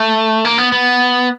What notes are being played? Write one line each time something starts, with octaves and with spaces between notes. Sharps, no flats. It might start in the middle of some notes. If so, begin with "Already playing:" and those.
Already playing: A3
A#3
B3
B3